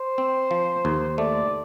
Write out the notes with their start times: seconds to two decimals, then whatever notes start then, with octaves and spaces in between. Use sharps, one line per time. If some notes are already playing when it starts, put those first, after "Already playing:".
Already playing: C5
0.18 C4
0.51 F3
0.85 D#2
1.18 A3 D5